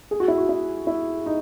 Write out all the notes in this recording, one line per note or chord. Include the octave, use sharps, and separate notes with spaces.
G#4
F#4
E4
F#4
E4
E4
D#4